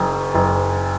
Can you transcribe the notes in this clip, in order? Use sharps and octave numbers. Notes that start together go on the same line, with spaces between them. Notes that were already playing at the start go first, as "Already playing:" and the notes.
Already playing: F#1 F#2
F#1